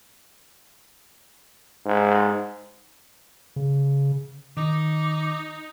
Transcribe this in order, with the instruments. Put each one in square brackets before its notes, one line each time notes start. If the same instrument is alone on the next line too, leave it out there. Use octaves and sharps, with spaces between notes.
[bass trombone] G#2
[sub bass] C#3
[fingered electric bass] D#3 [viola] D#4 [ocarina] D6